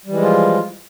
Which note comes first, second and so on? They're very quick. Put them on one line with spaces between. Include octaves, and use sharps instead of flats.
G3 E3 G#3 F3 F4